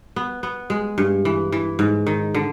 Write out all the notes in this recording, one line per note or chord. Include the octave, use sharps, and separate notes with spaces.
B3
B3
G#3
G2
E3
E3
G#2
D#3
D3